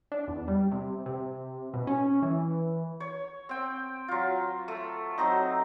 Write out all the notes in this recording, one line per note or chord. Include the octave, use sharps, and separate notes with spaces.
D4
E2
G3
C3
C3
B2
C#4
E3
C#5
C4 G5
F#3 F4
A3
F#3 C4 D#4